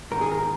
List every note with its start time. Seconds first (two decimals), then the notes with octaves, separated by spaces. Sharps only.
0.11 G#2 D#3 A#4
0.21 G#4
0.32 A#4